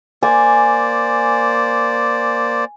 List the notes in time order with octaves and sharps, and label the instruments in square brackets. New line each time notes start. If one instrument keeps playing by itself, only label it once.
[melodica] A#3 C5 D5 [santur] G#5